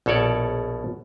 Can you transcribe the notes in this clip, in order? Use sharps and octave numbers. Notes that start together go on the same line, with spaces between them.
A#1 B2 A4 C#5 D5